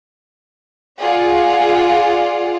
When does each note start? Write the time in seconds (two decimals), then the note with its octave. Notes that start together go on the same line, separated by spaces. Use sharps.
1.00 F4 G#4 D5 F#5